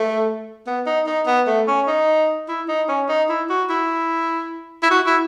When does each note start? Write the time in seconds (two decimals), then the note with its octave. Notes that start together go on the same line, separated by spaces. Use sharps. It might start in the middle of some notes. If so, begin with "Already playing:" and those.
Already playing: A3
0.67 B3
0.87 D#4
1.07 D#4
1.26 B3
1.47 A3
1.68 C#4
1.87 D#4
2.48 E4
2.68 D#4
2.88 C#4
3.09 D#4
3.29 E4
3.50 F#4
3.70 E4
4.83 E4
4.91 F#4
5.06 E4